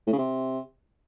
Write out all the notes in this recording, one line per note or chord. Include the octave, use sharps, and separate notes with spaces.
A2
C#3
C3